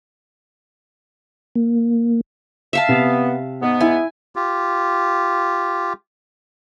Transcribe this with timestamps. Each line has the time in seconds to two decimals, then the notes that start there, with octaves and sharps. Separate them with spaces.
1.56 A#3
2.73 E5 F5 A5
2.89 C3 B3
3.62 G#2 B3
3.81 E4 G#5
4.36 F4 G4